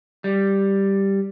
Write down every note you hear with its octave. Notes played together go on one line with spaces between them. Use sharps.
G3